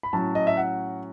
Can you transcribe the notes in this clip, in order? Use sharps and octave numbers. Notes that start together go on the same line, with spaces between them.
B5
A2 F#3 C#4 A5
D#5
E5
F#5